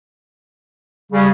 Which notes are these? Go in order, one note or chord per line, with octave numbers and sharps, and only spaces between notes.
C#3 G3